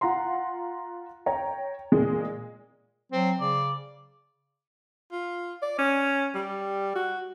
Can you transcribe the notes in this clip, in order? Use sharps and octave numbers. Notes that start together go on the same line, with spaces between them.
F4 F#5 A#5 C6
C#5 G5 A#5
A#2 G#3
F#3 C4
C#3 D5
F4
D5
C#4
G3
F#4